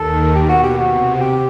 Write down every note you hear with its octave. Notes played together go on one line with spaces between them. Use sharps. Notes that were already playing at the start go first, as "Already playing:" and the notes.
Already playing: D#2 D#3 A4
B2 G4
F#4
G4
C3 F#4
F#4
G4